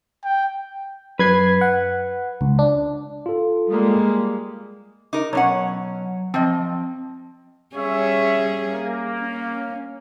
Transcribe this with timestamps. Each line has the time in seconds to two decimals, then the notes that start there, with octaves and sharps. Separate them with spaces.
0.24 G5
1.19 F#2 B4 G#6 C7
1.61 F#5
2.41 C#2
2.59 D4
3.26 F4 A4
3.70 G3 G#3 A#3
5.13 D#4 A#4 D6
5.33 B2 F#3 C#4 F#5
6.34 F3 C4 D#5
7.76 G3 C#4 G#4 C#5 E5
8.71 A#3
9.20 C#4